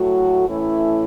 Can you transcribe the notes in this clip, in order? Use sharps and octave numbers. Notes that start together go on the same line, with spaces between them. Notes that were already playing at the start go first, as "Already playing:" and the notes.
Already playing: A2 F#3 A3 F#4
A2 E3 A3 C#4 E4